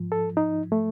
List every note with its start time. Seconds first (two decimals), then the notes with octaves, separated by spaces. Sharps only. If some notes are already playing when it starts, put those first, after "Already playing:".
Already playing: G#2 F3
0.12 A4
0.37 D#4
0.72 A3